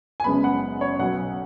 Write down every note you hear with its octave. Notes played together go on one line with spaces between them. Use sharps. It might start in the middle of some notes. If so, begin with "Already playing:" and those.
G#5
F#1 F#2 C#3 G#3 B3 B5
F#5
C#5
B1 B2 F#3 B3 F#5